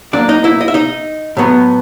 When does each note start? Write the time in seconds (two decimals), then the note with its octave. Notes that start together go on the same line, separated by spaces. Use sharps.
0.13 A#2 F#3 A#3 D4 D5
0.29 D#4 D#5
0.44 E4 E5
0.61 D#5
0.68 E5
0.74 D#4 D#5
1.37 A2 F#3 B3